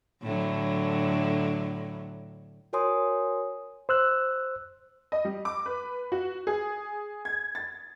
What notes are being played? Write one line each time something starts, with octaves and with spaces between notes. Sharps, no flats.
A2 D3 F#3
F#4 A#4 C#5 G#5 C6 D#6
C5 E6 F#6
D#5
G3
D6
B4
F#4
G#4
G#6
A6